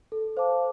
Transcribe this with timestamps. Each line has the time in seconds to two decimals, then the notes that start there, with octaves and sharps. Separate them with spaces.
0.12 A4
0.37 C5 F5 A5 D6